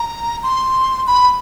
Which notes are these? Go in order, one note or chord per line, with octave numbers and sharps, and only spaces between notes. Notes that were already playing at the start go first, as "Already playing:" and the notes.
Already playing: A#5
C6
B5